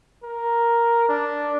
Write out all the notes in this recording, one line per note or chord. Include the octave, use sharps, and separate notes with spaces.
A#4
D4